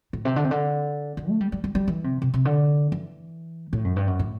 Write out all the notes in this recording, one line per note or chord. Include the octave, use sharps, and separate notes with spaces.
A2
C3
D3
C3
D3
D3
A3
G3
G3
G3
G3
E3
C3
C3
C3
D3
E3
A2
F#2
G2
F#2
A2